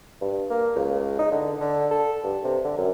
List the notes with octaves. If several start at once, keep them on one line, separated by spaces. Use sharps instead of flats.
G2
A#3
C#2
D#4
D3
D3
A4
G2
C3
D3
F#2